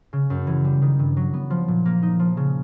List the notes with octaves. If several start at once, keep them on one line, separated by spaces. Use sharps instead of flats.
C#3
F#2
E3
G3
D#3
G2
F#3
B3
F3
A#2
A#3
D#4
F3
C#3